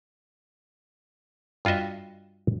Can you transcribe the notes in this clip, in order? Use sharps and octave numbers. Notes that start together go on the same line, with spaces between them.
G2 F4 F#4 D#5 E5